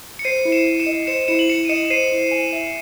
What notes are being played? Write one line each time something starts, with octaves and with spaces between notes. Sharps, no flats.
C#7
C5 C7 D#7
E4
C#7 E7
E4
C#7 E7
D#5
C5 C#7 E7
E4 C#7 E7
F#7
E4 C#7 E7
D#7
D#5 C#7 E7
E7
C5 C7 D#7
E4
G#5
E5